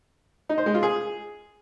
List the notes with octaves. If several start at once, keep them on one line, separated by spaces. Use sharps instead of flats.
D#4
C5
G#3
F4
G#4